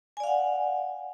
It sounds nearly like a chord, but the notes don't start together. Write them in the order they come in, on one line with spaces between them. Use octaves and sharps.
G#5 D5 F5 F#5